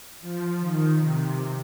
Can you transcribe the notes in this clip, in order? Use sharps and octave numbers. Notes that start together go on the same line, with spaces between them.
F3
D#3
C3